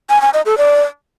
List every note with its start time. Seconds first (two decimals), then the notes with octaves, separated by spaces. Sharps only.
0.10 G#5
0.22 G#5
0.34 D#5
0.46 A4
0.58 D5